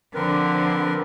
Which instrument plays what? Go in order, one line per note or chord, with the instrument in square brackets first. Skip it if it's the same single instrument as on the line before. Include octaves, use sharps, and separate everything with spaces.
[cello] D3 F3 [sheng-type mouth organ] C4 A#4 B4